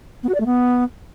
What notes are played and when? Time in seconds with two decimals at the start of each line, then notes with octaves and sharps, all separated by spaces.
0.23 B3
0.29 F#4
0.35 D5
0.40 A3
0.46 B3